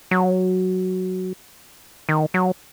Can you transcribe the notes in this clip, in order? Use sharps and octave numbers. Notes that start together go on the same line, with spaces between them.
F#3
D#3
F#3